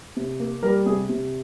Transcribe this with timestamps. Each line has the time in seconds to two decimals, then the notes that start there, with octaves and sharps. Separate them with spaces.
0.17 C3
0.40 A#3
0.63 G3 A#4
0.86 C3 G#4
1.09 C3